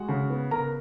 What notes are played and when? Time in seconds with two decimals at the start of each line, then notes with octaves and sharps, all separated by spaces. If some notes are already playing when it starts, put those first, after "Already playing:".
Already playing: G#3 F#4 F#5
0.08 C#3
0.30 B3
0.51 C#3 A#4 A#5